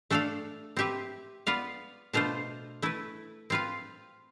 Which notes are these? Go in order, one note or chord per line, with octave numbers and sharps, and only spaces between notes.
A3 D4 A4 D5 F5
C4 G4 B4 E5
B3 F4 B4 D5 F5
B2 A3 D4 F4 C5
A3 E4 B4
C4 F4 B4 F5